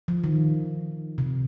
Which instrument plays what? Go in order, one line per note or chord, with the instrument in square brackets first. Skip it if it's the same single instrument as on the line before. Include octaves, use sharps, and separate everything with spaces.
[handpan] F3
D#3
C3